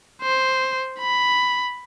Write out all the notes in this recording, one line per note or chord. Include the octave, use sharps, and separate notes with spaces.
C5
B5